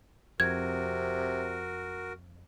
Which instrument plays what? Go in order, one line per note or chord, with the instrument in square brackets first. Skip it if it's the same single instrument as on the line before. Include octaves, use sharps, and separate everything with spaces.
[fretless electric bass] F2 [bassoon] C3 [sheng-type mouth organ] F#4 A#4 [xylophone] G#6